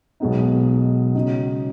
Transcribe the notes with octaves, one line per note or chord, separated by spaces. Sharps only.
B1 B2 G#3 B3 D#4
C#3 G#3 D#4 F#4